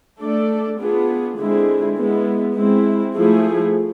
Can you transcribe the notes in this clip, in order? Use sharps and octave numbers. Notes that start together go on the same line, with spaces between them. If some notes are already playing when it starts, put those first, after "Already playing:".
A3 D4 A4 D5
B3 D4 F4 G#4
D3 G#3 C4 E4 G#4
G#3 B3 E4
G#3 C4 E4
F3 A3 E4 G#4